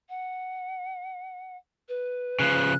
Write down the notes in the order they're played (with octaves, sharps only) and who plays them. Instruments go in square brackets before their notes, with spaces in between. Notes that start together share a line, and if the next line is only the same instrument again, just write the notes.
[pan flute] F#5
B4
[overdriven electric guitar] C#3 F3 [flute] F#6